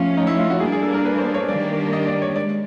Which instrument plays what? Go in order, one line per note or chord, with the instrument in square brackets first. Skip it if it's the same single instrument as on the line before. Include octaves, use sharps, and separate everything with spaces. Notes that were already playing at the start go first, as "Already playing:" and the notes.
Already playing: [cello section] F3 A3 C#4 [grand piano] F4
[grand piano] D#4
E4
F4
F#4
[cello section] G3 A#3 D4 [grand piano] G#4
[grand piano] G#4
A4
A#4
B4
C5
C#5
[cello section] D#3 G3 A#3 D4 G4 [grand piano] D5
[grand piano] D#5
D5
C#5
[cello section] G#3 [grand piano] D5